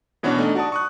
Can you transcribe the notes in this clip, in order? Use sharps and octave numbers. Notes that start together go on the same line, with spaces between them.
B2 E3 B3 C#4 D4 F#4
A3 D4 D#4
F#4 D5 A5 D#6
C#6 D#6 F#6